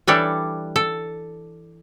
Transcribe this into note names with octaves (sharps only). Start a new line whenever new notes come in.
E3 G3 D4 A4 C#5
A4